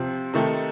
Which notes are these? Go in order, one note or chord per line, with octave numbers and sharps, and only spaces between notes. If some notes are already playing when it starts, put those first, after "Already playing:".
Already playing: C3 F3 C4
C3 D#3 A3 D#4 A4